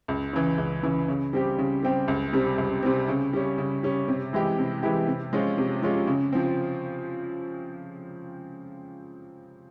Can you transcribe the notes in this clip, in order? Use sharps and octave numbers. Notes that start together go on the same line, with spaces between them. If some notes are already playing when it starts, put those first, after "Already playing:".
C#2
C#3 E3
C#2
C#3 E3
C#3
G3 C4 G4
C#3
G3 C4 G4
C#2
C3 G3 C4
C#2
C3 G3 C4
C#3
G3 C#4
C#3
G3 C#4
C3
E3 G#3 E4 G4
C3
E3 G#3 E4 G4
C3
F3 G#3 C#4 F4
C3
F3 G#3 C#4 F4
C#3
F3 C4